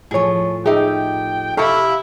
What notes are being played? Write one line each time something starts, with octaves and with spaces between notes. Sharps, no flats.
A2 F3 G#4 C#5
D#4 G4 G#4 E5 G5
C3 E4 G4 A4 F5 A5 C#6